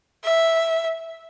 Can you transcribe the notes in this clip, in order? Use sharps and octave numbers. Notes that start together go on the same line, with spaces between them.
E5